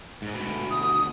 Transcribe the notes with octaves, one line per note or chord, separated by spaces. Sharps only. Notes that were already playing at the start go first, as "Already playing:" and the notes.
G#2
D2 B2
D#6